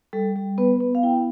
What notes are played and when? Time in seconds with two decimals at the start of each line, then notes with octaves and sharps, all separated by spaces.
0.13 G3 A4
0.36 G3
0.58 B3 B4
0.80 B3
0.95 F5
1.03 E4 G5